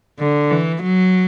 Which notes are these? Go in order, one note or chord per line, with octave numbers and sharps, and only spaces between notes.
D3
E3
F#3